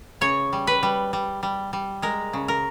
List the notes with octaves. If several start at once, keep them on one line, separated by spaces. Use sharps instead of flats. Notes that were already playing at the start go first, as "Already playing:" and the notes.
C#3 C#5
G3
B4
G3
G3
G3
G3
G#3 A#4
C#3
A#4